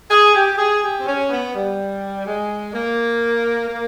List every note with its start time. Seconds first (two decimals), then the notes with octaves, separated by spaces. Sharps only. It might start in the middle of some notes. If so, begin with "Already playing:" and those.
0.11 G#4
0.35 G4
0.58 G#4
0.82 G4
0.97 C4
1.06 C#4
1.30 B3
1.54 G3
2.26 G#3
2.73 A#3
3.68 A#3